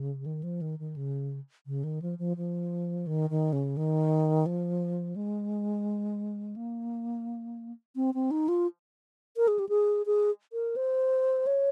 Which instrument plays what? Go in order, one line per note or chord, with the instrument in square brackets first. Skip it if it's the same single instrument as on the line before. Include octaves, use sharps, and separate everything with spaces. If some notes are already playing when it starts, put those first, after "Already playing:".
Already playing: [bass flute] C#3
D#3
F3
D#3
D#3
C#3
C#3
D#3
F3
F3
F3
D#3
D#3
C#3
D#3
F3
G#3
A#3
C4
C4
D#4
F4
A#4
G#4
G4
G#4
G#4
A#4
C5
C#5